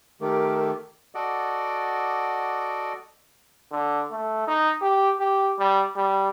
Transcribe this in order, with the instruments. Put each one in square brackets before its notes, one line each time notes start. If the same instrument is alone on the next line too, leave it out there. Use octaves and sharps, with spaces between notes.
[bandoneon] D#3 A3 [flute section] G4 A#4 D6
[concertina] F#4 A4 D5 D#5 F#5 D6
[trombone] D3
A3
D#4
G4
G4
G3
G3